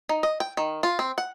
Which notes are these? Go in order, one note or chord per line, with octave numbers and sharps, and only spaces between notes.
D#4
D#5
G5
D#3
F4
C4
F#5